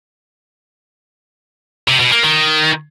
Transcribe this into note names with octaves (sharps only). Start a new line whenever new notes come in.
C3
B2
A#3
D#3